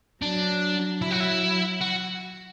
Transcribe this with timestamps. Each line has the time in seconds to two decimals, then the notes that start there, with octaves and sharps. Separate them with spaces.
0.22 F#3 D4
1.01 F#3 E4
1.11 F#4
1.20 E4
1.81 F#4